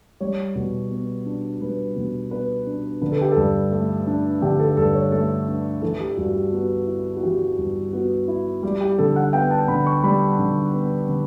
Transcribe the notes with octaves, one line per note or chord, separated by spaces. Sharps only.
G3 C#5
B2
B3
D4
G3 B4
B2
B3 B4
D4
D3 B4
A4
G4
G2 A4
A3
D4
D3 G4
A4
G2 A4
C#5
A3 A4
D4
E3 A4
G4
G2 F#4
G4
B3 F#4
E4
F#4
E3 G4
G2
B3 F#4
E4
G3 G4
G4
D3 A4
F#5
B3 G5
A5
D3 B5
C#6
G3 B5
D3
B3
D3